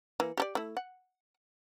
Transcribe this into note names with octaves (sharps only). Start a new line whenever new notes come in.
E3 A#3
G4 A4 D5
A3 E4
F#5